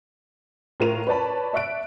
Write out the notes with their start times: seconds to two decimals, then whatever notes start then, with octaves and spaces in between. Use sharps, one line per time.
0.80 A2 F4 A#4 D#7 F7
1.07 B4 C#5 D5 A5 B5
1.53 D5 E5 C#6 F#6 D7